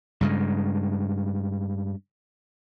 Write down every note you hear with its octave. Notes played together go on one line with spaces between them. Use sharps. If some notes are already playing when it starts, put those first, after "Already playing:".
G2 C#3 G#3